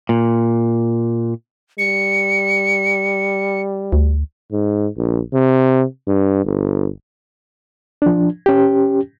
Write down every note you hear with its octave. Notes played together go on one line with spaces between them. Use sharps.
A#2
G3 C#7
D2
G#2
A#1
C3
G2
G1
F3 D4
C#4 G4